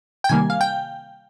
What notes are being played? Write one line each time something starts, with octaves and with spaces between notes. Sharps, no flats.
G5
C3 D#3 G3 A#3 G#5
F5
G5